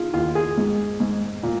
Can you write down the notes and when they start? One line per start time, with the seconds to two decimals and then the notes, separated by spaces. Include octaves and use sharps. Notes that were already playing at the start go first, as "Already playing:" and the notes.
Already playing: D#4 F4 G#4
0.13 D#2 F4
0.35 G#4
0.57 G#2
1.00 G#2
1.43 A#2